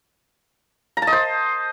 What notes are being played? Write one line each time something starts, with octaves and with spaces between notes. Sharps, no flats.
A#5
A5
D#5
C5